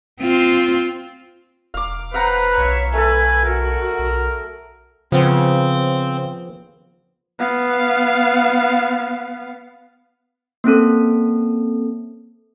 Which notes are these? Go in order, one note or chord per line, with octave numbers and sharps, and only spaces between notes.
C4 F4
E1 F5 D6
B4 C5 F5 F#5 A#5
B1 C#5 E5
A3 A4 B4 G#5
F#4 A#4
B1
C#3 F3 B3 C4
B3 F5
A#3 C4 C#4 A4